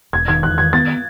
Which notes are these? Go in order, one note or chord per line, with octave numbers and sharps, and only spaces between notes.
E1 G#6
D#3 G#6
E2 F#6
D#3 G#6
B3 A6